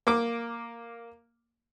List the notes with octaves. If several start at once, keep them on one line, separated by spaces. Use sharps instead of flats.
A#3 D6